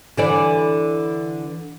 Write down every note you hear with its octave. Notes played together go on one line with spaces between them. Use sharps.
D3 E3 D5